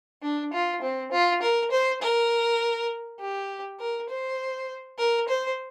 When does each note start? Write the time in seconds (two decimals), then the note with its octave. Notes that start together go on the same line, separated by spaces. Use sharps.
0.22 D4
0.53 F4
0.82 C4
1.12 F4
1.42 A#4
1.71 C5
2.02 A#4
3.19 G4
3.79 A#4
4.09 C5
4.98 A#4
5.28 C5